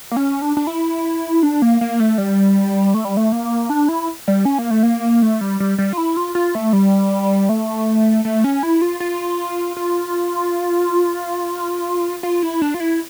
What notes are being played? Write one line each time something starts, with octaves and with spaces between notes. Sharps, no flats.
A#3
C#4
D4
D4
E4
D4
A#3
A#3
A3
G3
A3
G3
A3
A#3
D4
E4
G3
C#4
A#3
A3
A#3
A3
G3
G3
G3
F4
E4
F4
F4
A3
G3
A3
A3
C#4
E4
F4
F4
F4
F4
E4
D4
F4
E4